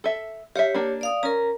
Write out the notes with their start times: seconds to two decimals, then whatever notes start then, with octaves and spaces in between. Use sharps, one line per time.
0.04 A4 E5
0.56 G4 C#5 E5 F5
0.74 A#3 D4
1.01 D5 F5 D#6
1.23 C#4 A#4 A#5